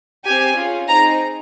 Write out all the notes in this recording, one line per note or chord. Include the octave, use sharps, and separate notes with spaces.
C4 G4 G#5
C#4 F4 G#4
C4 D#4 G#4 A#5